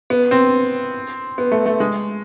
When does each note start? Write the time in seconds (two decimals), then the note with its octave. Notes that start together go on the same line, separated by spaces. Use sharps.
0.10 B3
0.31 C4
1.38 B3
1.52 A3
1.66 A3
1.80 G#3